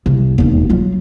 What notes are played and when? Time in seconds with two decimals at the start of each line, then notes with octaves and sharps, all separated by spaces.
0.06 C2
0.38 E1 D#2
0.70 F#3 F4